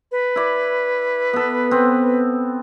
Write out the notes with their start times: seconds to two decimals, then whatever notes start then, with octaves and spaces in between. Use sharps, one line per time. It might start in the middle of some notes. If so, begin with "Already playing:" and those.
0.12 B4
0.36 E4 D5
1.33 B3 A4
1.71 B3 C4